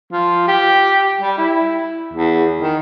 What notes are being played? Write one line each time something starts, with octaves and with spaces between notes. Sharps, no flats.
F3
G4
G3
E4
E2
D#3